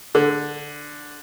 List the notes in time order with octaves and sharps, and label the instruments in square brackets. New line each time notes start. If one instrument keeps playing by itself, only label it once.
[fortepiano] D3